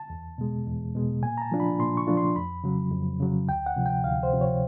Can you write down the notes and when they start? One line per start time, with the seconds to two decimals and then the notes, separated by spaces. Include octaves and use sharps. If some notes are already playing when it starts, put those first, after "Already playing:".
Already playing: A5
0.10 E2
0.38 B2 G#3
0.67 E2
0.95 B2 G#3
1.22 A#2 G#5
1.38 A#5
1.41 A5
1.51 F3 A3 D4 F4
1.60 B5
1.79 A#2 C6
1.97 C#6
2.07 F3 A3 D4 F4
2.17 C6
2.36 F2 B5
2.64 C#3 F#3
2.91 F2
3.20 C#3 F#3
3.48 D2 G5
3.66 F#5
3.76 C3 F3
3.86 G5
4.04 D2 F5
4.23 C5
4.33 C3 F3
4.41 C#5